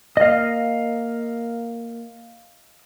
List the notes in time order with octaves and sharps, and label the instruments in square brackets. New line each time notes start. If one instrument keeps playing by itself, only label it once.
[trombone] A#3 [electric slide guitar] D#5 F5